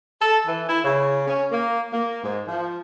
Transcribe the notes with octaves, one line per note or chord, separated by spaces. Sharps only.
A4
E3
E4
C#3
C#4
A#3
A#3
G#2
F3